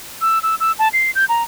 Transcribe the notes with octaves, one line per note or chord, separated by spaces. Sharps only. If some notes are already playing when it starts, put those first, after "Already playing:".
E6
E6
E6
A5
C7
G6
A#5